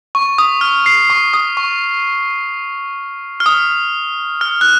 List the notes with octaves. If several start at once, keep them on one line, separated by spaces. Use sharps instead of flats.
C#6
D#6
F6
C7
C#6
D#6
C#6
F6
D#6
F6
F#6